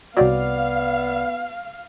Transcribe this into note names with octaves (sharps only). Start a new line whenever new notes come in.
C2 F#3 G3 B3 D5 F5